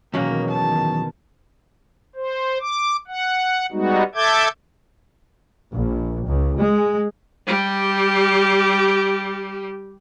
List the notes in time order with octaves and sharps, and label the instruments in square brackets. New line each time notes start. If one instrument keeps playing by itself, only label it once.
[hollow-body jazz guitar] E2 F#3 C#4 [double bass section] B2 D#3 [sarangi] A#3
[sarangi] A5
[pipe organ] C5
D6
F#5
G3 G#3 B3 D#4 F#4
A4 E5 A5 D6 G6 G#6
[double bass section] A#1
C#2
G#3
[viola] G3 G4